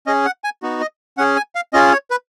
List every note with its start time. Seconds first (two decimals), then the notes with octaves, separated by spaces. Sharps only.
0.07 C#4 G#4 D#5
0.25 F#5
0.44 G#5
0.62 B3 D#4 F#4
0.81 D#5
1.18 C#4 G#4 F#5
1.36 G#5
1.55 F5
1.73 C#4 F4 G#4 D#5
1.92 C#5
2.10 B4